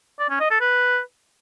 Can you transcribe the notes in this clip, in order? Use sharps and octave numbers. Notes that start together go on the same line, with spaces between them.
D5
C#4
D#5
A4
B4